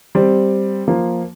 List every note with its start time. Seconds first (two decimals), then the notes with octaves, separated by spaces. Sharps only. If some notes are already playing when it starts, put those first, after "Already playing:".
0.15 G3 C4
0.88 F3 A#3